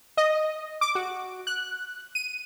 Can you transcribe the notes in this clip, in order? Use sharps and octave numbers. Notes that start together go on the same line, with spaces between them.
D#5
D6
F#4
F#6
D#7